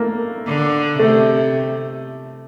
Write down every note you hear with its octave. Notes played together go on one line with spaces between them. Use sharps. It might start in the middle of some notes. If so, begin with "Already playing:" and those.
Already playing: A3 A#3
D3
C3 A3